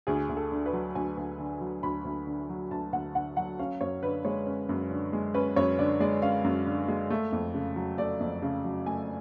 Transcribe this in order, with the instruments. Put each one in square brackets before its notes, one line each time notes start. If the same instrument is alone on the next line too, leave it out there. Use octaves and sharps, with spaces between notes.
[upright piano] D2 G#4
D2
A4
D3
B4
F#3
D2 G#5
D2
D3
F#3
D2 B5
D2
D3
F#3
D2 A5
D2 F#5
D3 F#5
F#3 F#5
C#4 F5
F#2 C#5
D3 B4
G#3 C#5
C#4
F#2
D3
G#3
C#4 B4
F#2 C#5
D3 D5
G#3 D5
C#4 F5
F#2
D3
G#3
A3
F2
C#3
F#3
A3 D5
F2
C#3
F#3
A3 G#5